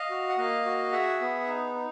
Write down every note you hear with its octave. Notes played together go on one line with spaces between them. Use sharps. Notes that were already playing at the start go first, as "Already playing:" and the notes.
Already playing: D#5 F5
F#4
F#5
A#3 D#5 F5
F#4
G#4 E5 F#5
B3
D#4
D#4